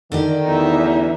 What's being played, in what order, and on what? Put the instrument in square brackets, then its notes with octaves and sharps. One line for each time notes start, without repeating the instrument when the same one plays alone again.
[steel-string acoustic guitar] D3 D4 G4 [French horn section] D#3
[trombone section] A1 E2 [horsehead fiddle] D#4 E5